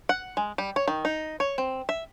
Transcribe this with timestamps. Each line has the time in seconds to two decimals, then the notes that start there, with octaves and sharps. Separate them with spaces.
0.09 F#5
0.37 G#3
0.58 G3
0.76 C#5
0.88 D#3
1.05 D#4
1.40 C#5
1.58 C4
1.89 E5